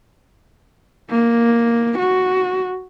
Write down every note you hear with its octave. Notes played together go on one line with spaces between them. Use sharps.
A#3
F#4